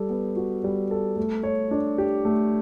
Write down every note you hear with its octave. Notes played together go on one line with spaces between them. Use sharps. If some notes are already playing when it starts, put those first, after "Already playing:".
Already playing: G3 A4
B3
F#4
G3
A4
A3
C#5
D4
G4
A3